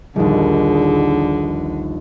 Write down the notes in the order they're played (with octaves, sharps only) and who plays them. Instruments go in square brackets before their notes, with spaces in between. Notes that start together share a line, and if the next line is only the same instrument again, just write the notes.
[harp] A#1 D#2 [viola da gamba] D3 [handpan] G3 D#4 [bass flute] G#4